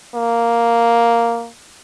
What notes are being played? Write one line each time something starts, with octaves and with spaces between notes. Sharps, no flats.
A#3